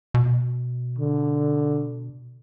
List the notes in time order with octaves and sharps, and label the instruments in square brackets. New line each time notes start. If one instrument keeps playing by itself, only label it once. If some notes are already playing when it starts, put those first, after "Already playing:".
[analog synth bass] B2
[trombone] D3